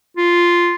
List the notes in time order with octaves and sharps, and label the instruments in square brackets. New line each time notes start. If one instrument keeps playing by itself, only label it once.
[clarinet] F4